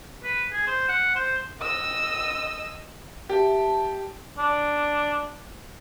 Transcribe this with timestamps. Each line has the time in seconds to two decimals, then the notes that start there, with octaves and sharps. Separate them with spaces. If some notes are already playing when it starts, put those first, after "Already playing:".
0.24 B4
0.52 G#4
0.67 C5
0.88 F#5
1.15 C5
1.60 D#5 E6
3.29 G4 E5 A5
4.38 D4